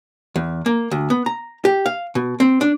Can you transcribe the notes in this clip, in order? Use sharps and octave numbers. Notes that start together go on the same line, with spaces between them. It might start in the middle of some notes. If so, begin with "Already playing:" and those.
E2
A#3
D2
B3
A#5
G4
F5
B2
C4
D4